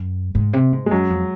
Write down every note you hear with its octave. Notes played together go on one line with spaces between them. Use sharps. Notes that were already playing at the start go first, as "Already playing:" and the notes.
Already playing: F#2
G#2
C3
G#2
G#3
F#2 F#3
F2